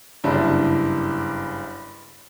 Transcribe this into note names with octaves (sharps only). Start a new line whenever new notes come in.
F#1 G2 D4 E4